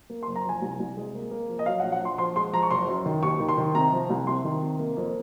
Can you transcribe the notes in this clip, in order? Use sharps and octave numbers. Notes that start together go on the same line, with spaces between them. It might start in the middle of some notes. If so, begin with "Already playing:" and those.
A#3
C6
F#1
A#5
F3 G#5
C2
C2
G#3
A#3
A#3
F3
D#5
F#3 F5
F#5
A#1
F#5
A#1 C6
F3 C6
G#3 C6
F3 A#5
C#6
F#1 C6
F#2
D#3
D#2 C#6
D#3
C6
D#3
C3 A#5
F3
C2
C3 C6
D#3
C3
A#3
F2